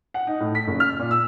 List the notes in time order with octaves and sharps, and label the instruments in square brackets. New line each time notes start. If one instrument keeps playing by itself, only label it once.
[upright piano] F#5
D#4
A2
B6
F#1
F6
A#2
E6